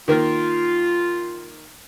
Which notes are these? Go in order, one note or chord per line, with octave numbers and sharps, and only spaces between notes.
D#3 A#3 F4 A#4